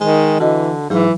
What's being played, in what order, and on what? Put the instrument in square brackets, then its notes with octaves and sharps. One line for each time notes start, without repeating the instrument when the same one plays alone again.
[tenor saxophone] D#3 [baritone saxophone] G#3
[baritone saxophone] D3 [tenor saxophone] E3 [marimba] F#4 D#5
[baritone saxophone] G#2 [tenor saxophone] E3 [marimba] F#3